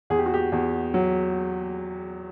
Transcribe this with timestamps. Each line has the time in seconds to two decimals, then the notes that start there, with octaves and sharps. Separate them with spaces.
0.10 E2 G#4
0.19 G4
0.26 F#4
0.34 G4
0.52 E2
0.94 F#3